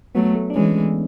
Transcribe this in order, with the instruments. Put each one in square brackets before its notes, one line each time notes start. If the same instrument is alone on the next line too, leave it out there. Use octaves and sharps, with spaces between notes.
[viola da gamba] F#3 A3 [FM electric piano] B3
[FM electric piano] A3
D4
[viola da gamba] E3 G#3 [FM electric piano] C#4